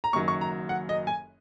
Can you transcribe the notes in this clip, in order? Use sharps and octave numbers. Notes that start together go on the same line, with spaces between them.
A#5
F#1 F#2 D#3 F#3 C#6
C#6
A#5
F#5
D#5
G#5